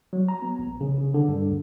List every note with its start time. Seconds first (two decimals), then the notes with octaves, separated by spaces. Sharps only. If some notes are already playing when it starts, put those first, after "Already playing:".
0.13 F#3
0.28 A#5
0.42 B3
0.59 A#1
0.81 C#3
0.98 C#3
1.14 D3
1.28 G2
1.49 D2